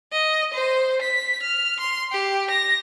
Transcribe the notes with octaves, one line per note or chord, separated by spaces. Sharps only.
D#5
C5
B6
F6
C6
G4
A#6